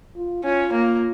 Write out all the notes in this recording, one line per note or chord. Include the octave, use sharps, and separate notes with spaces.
F4
C#4 F4
A#3